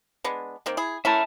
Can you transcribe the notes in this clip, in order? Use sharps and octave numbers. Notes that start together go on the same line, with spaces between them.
G#3 B3 D4
D#3 A#3 C4
E4 G#4
C#4 E4 A#4 E5 A5